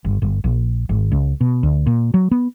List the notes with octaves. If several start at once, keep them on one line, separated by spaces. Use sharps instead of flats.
G1
G1
A#1
G#1
C#2
B2
D2
A#2
F#3
B3